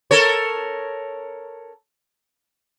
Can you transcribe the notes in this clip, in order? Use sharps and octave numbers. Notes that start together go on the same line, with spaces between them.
A4 A#4 C#5